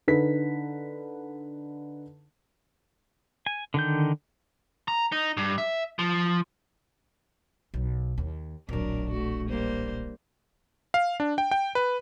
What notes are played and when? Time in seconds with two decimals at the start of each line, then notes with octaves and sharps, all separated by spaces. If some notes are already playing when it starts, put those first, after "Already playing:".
0.08 D3 D#4 B4 B6
3.46 G#5
3.74 D3 D#3 G6
4.88 A#5
5.12 D#4
5.37 G2
5.58 E5
5.99 F3
7.74 B1
8.18 D#2
8.69 D1 A#1 F#3 D4 A#4
9.10 A3 F#4
9.48 G3 A#3 C5
10.94 F5
11.20 D4
11.38 G5
11.51 G5
11.75 B4